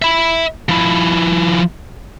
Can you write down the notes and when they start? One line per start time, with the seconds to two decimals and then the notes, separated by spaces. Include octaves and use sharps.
0.02 E5 B5
0.69 F3 E4